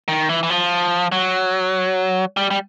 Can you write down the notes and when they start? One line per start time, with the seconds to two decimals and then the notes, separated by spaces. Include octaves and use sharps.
0.08 D#3
0.29 E3
0.43 E3
0.50 F3
1.12 F#3
2.37 G3
2.51 G3